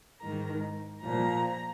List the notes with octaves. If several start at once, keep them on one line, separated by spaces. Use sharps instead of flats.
G#2 D#3 A#5
A#2 F3 A#5